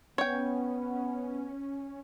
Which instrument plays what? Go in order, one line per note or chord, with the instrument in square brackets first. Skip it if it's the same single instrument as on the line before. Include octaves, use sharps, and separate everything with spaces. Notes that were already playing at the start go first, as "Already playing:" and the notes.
[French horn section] B3 [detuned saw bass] C#4 [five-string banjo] C#5 G5